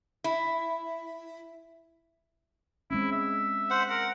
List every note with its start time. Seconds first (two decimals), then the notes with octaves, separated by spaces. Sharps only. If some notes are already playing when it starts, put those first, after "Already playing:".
0.24 E4
2.91 G#3 C4 C#4 E4
3.12 E5
3.71 C5 F#5
3.90 A#4 F#5